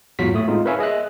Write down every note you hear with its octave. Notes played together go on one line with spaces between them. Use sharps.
E2 G#2 F#3 F4 F#4 B6
A2 A3 D#6
G#3 C4 D#4 F4
A#4 B4 C#5 E5 F5 G#5
G#4 D#5 E5 F#6